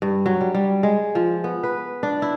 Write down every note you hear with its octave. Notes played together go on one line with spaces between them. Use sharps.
G2
F#3
G3
G3
G#3
F3
B3
B4
D4
E4